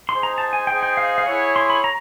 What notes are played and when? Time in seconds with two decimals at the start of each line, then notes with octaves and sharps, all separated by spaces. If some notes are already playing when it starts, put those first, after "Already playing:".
0.09 D#4 G#4 C5 C6
0.23 A#5
0.38 A5
0.53 G#5
0.67 D#4 G#4 C5 G5
0.83 G5
0.97 F5
1.18 F5
1.26 E4 G#4 C#5 F#5
1.56 C6
1.70 B5
1.84 A#5